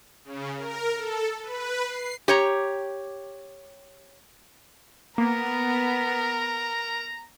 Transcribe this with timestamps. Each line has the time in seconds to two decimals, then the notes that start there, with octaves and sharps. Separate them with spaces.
0.24 C#3
0.57 A#4
0.95 A4
1.43 B4
1.86 C7
2.28 G4 C#5 A#5
5.18 A#3 B3 A#4 A#5